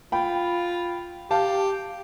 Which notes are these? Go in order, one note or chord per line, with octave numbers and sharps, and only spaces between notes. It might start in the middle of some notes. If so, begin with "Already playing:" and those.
F4 G5 B5
G4 F5 A5